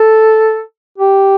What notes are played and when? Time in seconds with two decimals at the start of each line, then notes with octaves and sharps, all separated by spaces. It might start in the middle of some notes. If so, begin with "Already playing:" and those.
Already playing: A4
0.98 G4